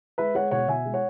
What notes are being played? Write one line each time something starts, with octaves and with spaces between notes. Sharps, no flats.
G#3 B4 E5
G#3 C#5 F#5
B2 C#5 F#5
B2 E5 G#5
G#3
C#5 F#5